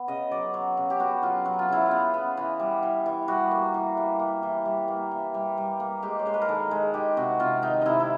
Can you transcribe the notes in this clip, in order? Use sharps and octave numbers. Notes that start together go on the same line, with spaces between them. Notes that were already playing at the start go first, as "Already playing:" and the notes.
Already playing: B3
C#3 D#5
F#3 D5
F#3 C#5
C#3
G4
B3 F#4
F#3 F4
F#3 F#4
F4
C#3 E4
F4
B3
B3
E3
G3
E3
E3
G3 F#4
A#3
E3
G3
A#3
E3
G3
A#3
E3
G3
G3
A#3
G#3 G4
C#5
G#3 C5
B4
A#4
D#3 A4
G#3
D#3 G4
C3 F#4
C3 F4
D#3 D#4
C3 D#4 E4
E4